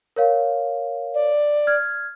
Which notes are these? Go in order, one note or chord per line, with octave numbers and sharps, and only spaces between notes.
A#4 C#5 F5
D5
F6 G#6